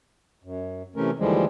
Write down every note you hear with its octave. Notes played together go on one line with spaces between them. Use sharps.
F#2
C3 E3 A3 C#4 A#4
D#2 D3 E3 F3 G3 G#3